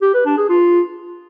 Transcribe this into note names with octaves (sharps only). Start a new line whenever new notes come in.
G4
B4
D4
G#4
F4